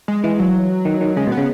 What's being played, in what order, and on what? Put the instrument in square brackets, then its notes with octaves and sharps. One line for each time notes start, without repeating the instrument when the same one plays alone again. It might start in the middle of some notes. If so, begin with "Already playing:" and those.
[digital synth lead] G#3
[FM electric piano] E3 [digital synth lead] G#3
[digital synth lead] F#3
[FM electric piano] D#3
D#3
[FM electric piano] C#3 [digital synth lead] G#3
[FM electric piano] B2
[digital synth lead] B3
[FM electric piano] C#3